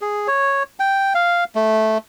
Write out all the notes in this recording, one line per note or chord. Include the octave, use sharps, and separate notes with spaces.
G#4
C#5
G5
F5
A3